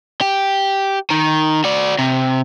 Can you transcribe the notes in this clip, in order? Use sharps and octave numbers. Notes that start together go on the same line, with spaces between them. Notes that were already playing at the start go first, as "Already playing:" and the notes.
G4
D#3
F#4 D5
C3